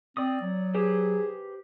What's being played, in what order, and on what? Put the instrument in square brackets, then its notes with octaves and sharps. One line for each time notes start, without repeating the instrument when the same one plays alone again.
[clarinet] C4 [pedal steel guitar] D5 D#6
[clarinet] F#3
[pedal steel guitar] G4 B4 C5 [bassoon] G#4